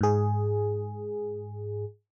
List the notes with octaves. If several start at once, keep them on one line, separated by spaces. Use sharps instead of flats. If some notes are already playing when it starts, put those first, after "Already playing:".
G#2 G#4